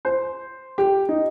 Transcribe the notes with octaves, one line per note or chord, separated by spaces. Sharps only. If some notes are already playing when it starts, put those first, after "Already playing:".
C5
G4
D#4